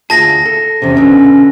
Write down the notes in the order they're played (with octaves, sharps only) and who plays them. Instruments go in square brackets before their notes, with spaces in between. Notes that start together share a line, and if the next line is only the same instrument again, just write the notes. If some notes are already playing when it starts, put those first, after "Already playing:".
[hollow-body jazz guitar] D2 F4 G#4 [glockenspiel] A5 A#6
[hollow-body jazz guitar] A4
[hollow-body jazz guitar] E2 C3 [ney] C#4
[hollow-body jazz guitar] B2 D3